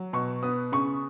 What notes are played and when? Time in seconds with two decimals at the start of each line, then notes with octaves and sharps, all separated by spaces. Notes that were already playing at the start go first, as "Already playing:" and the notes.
Already playing: F#3
0.13 B2 C#6
0.43 B3 D#6
0.72 C#3 C#6